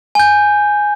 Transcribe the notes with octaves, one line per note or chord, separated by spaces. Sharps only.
G#5 G6